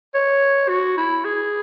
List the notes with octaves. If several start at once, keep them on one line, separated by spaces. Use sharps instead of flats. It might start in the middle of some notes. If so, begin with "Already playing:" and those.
C#5
F#4
E4
G#4